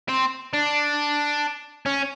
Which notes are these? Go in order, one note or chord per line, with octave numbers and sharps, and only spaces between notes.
C4
D4
C#4